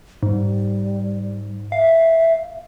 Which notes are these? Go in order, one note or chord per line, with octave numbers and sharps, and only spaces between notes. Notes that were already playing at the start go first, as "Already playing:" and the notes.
G#2 G3
E5 F5